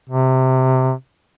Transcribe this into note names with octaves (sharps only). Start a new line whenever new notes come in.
C3